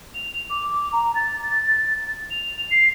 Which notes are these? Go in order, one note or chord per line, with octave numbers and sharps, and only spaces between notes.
F7
D6
A#5
A6
F7
C7